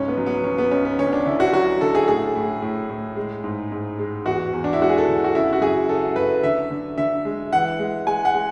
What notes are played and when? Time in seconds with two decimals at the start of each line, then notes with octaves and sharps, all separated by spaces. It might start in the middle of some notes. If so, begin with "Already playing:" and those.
Already playing: C#2 G#2 C#4
0.08 B3
0.17 F#3
0.26 B3
0.44 F#3 C#4
0.58 B3
0.71 C#2 C#4
0.85 B3
0.99 D2 C#4
1.13 D4
1.26 D3 E4
1.40 F#4
1.53 F#3 F#4
1.81 D3 A4
1.95 G#4
2.08 A2 G#4
2.35 A2
2.62 A2
2.90 A2
3.16 G#3
3.44 G#2
3.72 G#2
3.99 G#3
4.25 E2 F#4
4.53 E2
4.64 D4
4.73 E4
4.81 G#3 F#4
4.89 G#4
4.98 A4
5.08 D3
5.24 F#4
5.34 C#3 E4
5.53 F#4
5.61 F#2 G#4
5.89 C#3 A4
6.16 F#2 B4
6.43 D3 E5
6.70 D3
6.98 D3 E5
7.25 G#3
7.53 E3 F#5
7.79 G#3
8.07 G#3 G#5
8.25 F#5
8.34 G#3